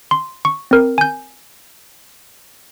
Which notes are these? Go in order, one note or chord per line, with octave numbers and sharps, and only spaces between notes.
C6
C#6
C4 A#4
G#5 G6